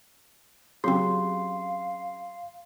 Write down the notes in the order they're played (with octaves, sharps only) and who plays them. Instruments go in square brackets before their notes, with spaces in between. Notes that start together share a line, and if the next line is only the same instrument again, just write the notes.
[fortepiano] C#3 F#3 [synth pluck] C4 G4 [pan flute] F5 [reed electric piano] C6